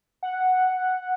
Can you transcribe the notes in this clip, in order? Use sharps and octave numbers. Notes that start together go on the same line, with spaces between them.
F#5